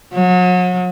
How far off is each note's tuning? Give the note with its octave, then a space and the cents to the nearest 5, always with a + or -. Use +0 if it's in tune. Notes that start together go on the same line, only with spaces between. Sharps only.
F#3 -35